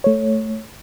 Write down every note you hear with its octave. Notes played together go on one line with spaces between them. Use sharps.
A3 C#5